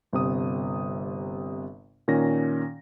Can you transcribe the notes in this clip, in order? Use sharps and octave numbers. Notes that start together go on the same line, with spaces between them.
G1 C3 D#6
A#2 D#3 C#4 A#6